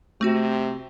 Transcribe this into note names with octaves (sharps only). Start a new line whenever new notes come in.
C3 A3 C4 F#4